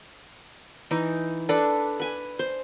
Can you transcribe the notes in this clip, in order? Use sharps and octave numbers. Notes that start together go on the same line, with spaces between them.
E3 D#4
D4 A4 B4
B4 G#5
C5